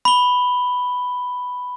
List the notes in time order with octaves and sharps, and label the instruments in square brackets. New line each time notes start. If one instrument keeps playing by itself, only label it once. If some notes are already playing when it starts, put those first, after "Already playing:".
[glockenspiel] B5 G7